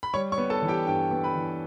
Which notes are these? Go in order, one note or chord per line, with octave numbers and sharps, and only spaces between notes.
B5
G3 C#5 C#6
C#5 C#6
B3
A4 A5
E3
G4 G5
G2 G4 G5
B3
B4 B5
E3